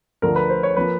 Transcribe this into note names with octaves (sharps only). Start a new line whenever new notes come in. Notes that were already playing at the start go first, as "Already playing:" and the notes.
D2 D3 F3 A3 A#4
B4
C5
C#5
F3 A#3 B4